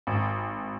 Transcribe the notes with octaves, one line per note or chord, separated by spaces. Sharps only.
G#1